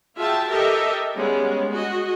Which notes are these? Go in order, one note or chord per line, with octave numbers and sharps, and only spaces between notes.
F4 F#4 G#4 E5 G5 A5
G4 A4 A#4 D#5 E5
G3 G#3 B3 C#4
F#4 G#4 D#5